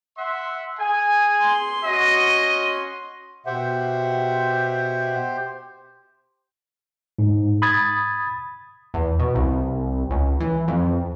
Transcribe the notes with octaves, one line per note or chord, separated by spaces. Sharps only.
E5 F#5 C6
G#4 G#5
C6
C#4 F#4 D#5
B2 G4 C5 E5 F#5
G#2
B5 D#6 G#6 A6
E2
B2
C2
C#2
E3
F2